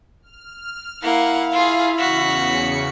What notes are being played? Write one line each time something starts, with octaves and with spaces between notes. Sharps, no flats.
F6
A#3 E4 F5 F#5
F4 G#4
E2 C#3 F#4 B6 C#7